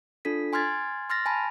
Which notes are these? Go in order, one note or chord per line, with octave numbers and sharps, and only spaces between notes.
D4 F4 A4 B6
G#5 C6 F6 G#6 A6
C6 F6 A6 A#6
G#5 A5 B5